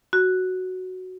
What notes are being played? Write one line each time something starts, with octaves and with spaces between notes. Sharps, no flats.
F#4